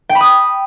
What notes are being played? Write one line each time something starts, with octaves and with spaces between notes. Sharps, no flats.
G5
B5
D#6